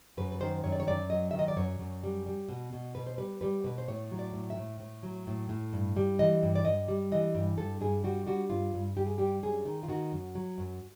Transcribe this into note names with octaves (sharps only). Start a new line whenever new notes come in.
F#2 B4
B4
D#3 C5
F#2 C#5
D5
C#5
F#2 D5
F#3 D#5
D#3 E5
D#5
D5
F#2 C#5
F#2
G3
G3
B2
B2
B2 B4
C5
G3 B4
G3 B4
B2 B4
C5
A2 C#5
F#3
D5
A2
E5
A2
A2
F#3
A2
A2
G2
G3
E3 D#5
G2
D5
G2 D#5
G3
E3 D#5
G2
G2 A4
G2 G#4
G3 F#4
G3 F#4
G2 F4
G2
G2 G4
G#4
G3 G4
F#2 G#4
D#3
F4
D#3 F#4
F#2
F#3
F#2